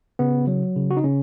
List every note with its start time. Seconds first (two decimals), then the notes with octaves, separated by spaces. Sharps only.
0.19 C#3 B3
0.47 F#3
0.76 C#3
0.91 F#4
0.97 D#4
1.04 C#3 C#4